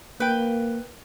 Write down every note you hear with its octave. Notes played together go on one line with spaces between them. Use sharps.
A#3 B4 G5